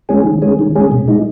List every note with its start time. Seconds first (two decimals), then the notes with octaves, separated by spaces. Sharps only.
0.09 G#3 C#4 G#4
0.25 D#3
0.42 G#3 C#4 G#4
0.59 D#3
0.75 G#3 C#4 G#4
0.92 B2
1.08 G#3 D#4